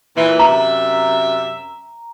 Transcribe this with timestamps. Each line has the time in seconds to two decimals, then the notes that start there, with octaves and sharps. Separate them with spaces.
0.17 A#2 E3
0.39 F#2 C3 E5 A#5